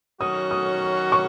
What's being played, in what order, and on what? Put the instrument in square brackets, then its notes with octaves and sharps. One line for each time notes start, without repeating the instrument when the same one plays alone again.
[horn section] D#3 F#3 C#4 F#4 [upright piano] D#6
[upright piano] D#6
C#6